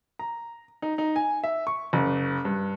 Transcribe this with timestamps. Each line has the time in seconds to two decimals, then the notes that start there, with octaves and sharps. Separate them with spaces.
0.19 A#5
0.82 D#4
0.98 D#4
1.16 G#5
1.44 E5
1.67 C#6
1.93 F#1
2.45 G2